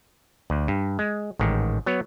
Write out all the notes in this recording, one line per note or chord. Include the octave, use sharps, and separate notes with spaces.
D2
G2
G#3
A1 G#2 D#3
F#3 B3 C#5